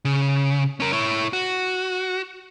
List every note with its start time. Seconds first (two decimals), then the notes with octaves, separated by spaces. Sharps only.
0.05 C#3
0.80 C#4 A#4
0.93 E4 C#5
1.33 F#4